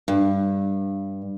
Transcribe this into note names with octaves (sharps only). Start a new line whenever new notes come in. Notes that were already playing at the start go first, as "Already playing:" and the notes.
G2